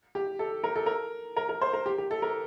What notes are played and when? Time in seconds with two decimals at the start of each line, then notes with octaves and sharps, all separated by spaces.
0.15 G4
0.39 A4
0.64 A#4
0.76 A4
0.86 A#4
1.36 A#4
1.49 A#4
1.62 C5
1.73 A#4
1.86 G4
1.98 G4
2.11 A4
2.22 A#4